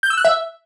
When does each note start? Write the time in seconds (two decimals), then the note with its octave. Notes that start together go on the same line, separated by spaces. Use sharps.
0.03 G6
0.10 E6
0.17 F#6
0.25 E5